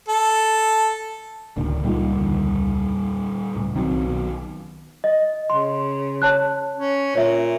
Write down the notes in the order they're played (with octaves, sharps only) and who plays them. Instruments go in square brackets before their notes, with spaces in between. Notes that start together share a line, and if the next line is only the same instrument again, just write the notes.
[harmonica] A4
[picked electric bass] D1 [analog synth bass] C#2 [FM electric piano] D#3 A#3 D4
[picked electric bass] A#2 G3 A#3 [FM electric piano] G#3 D#4 F4
[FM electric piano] E2 D3
[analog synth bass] C#2 [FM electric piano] A2
[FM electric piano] B1 [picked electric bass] D#3 F#3 [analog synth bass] C4
[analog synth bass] B2
[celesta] D#5
[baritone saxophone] C#3 [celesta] C6
[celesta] C#5 A5 F#6
[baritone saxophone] C#4
[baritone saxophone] A#2 [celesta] C#5 E5